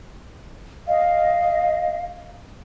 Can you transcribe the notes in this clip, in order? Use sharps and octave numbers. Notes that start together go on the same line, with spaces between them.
D#5 F5